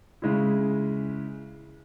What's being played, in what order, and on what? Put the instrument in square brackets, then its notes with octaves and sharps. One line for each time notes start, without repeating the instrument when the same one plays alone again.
[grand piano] C#3 G#3 E4